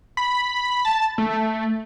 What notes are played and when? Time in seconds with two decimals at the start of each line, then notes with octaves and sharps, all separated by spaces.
0.17 B5
0.85 A5
1.18 A3